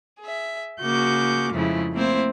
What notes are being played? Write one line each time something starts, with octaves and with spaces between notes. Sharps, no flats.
G#4 E5
C#3 A#3 F#4 D6 G6
F2 G#2 C#3 A3 E4
A3 A#3 C4 E4 C5